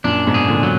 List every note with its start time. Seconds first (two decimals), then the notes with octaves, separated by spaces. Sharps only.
0.04 F#2 A#2 D4
0.27 G#2 B2
0.34 G#4
0.48 A#2 D3
0.63 F#3